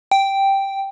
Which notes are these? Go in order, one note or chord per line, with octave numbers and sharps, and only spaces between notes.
G5